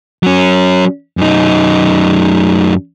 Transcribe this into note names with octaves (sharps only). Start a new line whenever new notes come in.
F#3 C#4
F#2 D#4